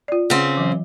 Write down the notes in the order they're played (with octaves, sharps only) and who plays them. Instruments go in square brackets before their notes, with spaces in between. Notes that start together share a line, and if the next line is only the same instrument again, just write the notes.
[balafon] F4 D5
[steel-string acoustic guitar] C#3 C4 [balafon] F#5
[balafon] E3 F#3